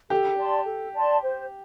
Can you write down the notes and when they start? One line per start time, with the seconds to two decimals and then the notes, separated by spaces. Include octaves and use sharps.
0.10 G4 A4
0.38 D5 A5 C6
0.66 A4
0.95 D5 A5 C6
1.23 C5